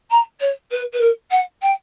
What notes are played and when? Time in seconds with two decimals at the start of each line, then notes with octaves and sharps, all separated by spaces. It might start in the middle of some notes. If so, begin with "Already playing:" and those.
0.10 A#5
0.40 C#5
0.71 B4
0.93 B4
1.00 A#4
1.30 F#5
1.62 G5